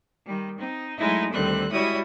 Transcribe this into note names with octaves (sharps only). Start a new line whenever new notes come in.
D#3 G3
C4 D#4
F#3 G#3 A3 D#4 E4
D2 D3 D#3 G3 C4 F#6
G3 G#3 E4 F#4 C#5 D#6